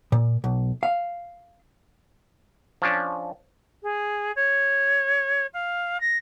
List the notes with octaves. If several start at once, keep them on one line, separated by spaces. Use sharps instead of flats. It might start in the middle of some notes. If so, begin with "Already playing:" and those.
A#2
B1
F5
F3 C#4 D4
G#4
C#5
F5
A#6